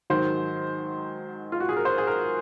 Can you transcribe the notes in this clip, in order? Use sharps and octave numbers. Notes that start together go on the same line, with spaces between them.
G#2 D#3 F#3 C5
F4
F#4
G#4
A#4
C5
G#4
A#4